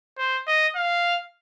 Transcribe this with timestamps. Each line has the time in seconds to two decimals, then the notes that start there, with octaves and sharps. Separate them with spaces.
0.18 C5
0.47 D#5
0.76 F5